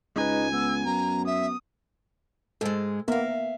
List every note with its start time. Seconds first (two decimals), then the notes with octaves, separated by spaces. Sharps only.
0.16 C#2 G#3 D#4 B4 G#5
0.54 B3 E6
0.86 F#2 A#5
1.27 E5 D#6
2.61 G#2 G#3 A4
3.08 A#3 B3 A#4 E5 F5